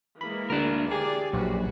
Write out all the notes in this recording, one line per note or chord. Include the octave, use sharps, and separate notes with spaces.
E3 G#3 A#3 B5
D2 D4 A#4
G4 G#4 D5
A#1 F#2 F#4 B4